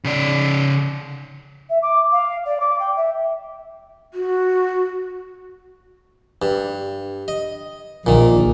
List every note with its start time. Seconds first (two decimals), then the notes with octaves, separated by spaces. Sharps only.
0.05 C#3 D5
1.69 E5
1.82 D6
2.12 F5
2.45 D5
2.60 D6
2.79 G5
2.96 E5
4.12 F#4
6.42 G2
7.28 D#5
8.06 A#1 A#2 D#3